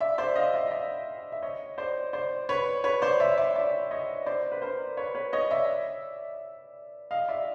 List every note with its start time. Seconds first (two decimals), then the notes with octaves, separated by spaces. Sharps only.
0.01 D5 E5
0.18 C5 D5
0.36 D#5 F5
0.54 D5 E5
0.71 D5 E5
1.32 E5
1.42 C#5 D#5
1.78 C5 D5
2.13 C5 D5
2.49 B4 C#5
2.84 B4 C#5
3.02 C5 D5
3.20 D5 E5
3.38 D5 E5
3.55 D5 E5
3.91 C#5 D#5
4.26 C5 D5
4.52 B4
4.62 A#4 C5
4.97 B4 C#5
5.15 B4 C#5
5.33 C#5 D#5
5.51 D5 E5
7.11 D#5 F5
7.29 D5 E5